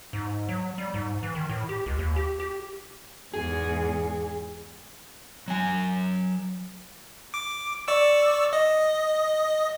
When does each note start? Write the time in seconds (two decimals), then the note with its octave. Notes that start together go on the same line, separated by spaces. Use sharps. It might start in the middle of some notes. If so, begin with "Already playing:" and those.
0.13 G#2
0.49 F#3
0.78 G3
0.94 G#2
1.23 E3
1.35 D#3
1.49 A2
1.69 G4
1.86 C#2
1.99 D#2
2.16 G4
2.40 G4
3.34 E2 G#2 G#4
5.48 F#3 G#5
7.34 D6
7.88 D5 C#6 E6
8.53 D#5